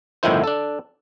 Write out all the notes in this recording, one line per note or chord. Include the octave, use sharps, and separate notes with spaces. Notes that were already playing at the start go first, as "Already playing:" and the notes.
G1 A2 D#3 F3 E4 C5
D4 A4